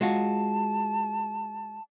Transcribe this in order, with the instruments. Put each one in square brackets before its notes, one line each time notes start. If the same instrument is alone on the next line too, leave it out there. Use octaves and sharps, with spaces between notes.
[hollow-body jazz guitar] G#3 F4 F#4 [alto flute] A5